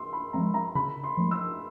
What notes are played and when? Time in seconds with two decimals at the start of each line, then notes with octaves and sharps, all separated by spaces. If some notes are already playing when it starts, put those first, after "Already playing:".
Already playing: C6 E6
0.13 B5
0.33 F3 G#3 C4 A#5
0.54 A#5
0.75 C#3 B5
1.04 C6
1.17 F3 A3
1.31 E6